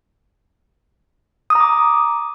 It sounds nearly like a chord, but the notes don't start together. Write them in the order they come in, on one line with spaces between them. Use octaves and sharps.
D#6 A#5 D6